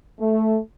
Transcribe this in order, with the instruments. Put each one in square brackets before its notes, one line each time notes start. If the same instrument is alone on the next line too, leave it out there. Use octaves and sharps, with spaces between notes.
[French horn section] A3